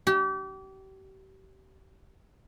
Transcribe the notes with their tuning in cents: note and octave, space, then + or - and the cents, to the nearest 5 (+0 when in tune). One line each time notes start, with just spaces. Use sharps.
G4 -35